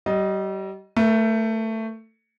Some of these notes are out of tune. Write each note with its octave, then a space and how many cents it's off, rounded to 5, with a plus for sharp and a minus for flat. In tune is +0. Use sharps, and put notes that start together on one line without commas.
G3 -35 D#5 +0
A3 +15 A#4 +45